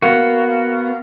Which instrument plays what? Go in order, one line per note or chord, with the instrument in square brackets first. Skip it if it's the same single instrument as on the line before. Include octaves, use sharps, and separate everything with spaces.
[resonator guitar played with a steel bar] A#3 [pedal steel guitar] B3 F#4